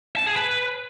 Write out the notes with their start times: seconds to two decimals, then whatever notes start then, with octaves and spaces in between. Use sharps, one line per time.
0.16 A5
0.26 G#4
0.36 B4